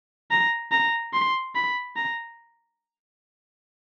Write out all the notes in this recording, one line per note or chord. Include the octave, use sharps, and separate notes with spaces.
A#5
A#5
C6
B5
A#5